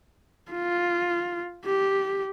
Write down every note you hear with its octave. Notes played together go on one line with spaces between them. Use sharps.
F4
G4